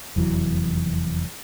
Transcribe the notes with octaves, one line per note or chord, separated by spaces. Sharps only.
F1 E2 E3 F#3